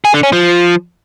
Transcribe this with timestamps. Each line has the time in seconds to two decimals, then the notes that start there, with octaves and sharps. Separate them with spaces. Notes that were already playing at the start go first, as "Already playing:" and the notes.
0.05 G#4
0.14 D3
0.23 C#4
0.33 F3